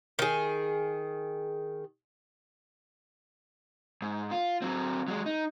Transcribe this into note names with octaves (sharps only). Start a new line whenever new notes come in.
D#3 G#4
G#2
F4
F#3 C4
F#3 G#3
D#4